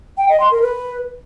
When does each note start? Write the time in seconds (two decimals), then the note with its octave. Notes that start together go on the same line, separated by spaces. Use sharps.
0.18 G5
0.29 D#5
0.40 C6
0.51 A#4
0.62 B4